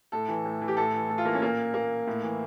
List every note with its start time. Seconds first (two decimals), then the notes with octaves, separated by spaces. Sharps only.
0.12 A2 A4
0.28 E3
0.45 A2
0.62 E3
0.68 G4
0.77 A2 A4
0.93 E3
1.10 A2 A4
1.18 F4
1.25 E3 A#3
1.34 C#4
1.42 A#2 A#3
1.74 A#2 A#3
2.07 A2
2.22 E3